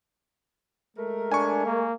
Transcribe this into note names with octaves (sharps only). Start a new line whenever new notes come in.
G#3 A3 A#4
D4 G#5 C#6
A#3